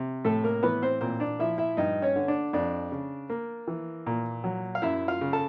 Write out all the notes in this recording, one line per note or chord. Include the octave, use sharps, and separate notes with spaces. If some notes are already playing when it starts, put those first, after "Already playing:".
Already playing: C3
A2 A3 A4
A#3 A#4
E3 B3 B4
C4 C5
A#2 C4 C5
D4 D5
F3 E4 E5
E4 E5
G2 D#4 D#5
C#4 C#5
D3
D4 D5
F2 D4 D5
C#3
A#3
E3
A#2
F#3
F5
F#2 E4 E5
F4 F5
C#3
A4 A5